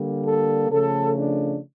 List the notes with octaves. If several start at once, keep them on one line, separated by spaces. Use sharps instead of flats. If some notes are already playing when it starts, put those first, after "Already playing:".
Already playing: D3 G3 A#3
A4
C#3 F3 A3 A4
D4